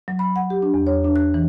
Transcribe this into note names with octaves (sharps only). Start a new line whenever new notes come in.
F#3
B5
F#5
G4
D4
E2
C#5
D4
F#6
E3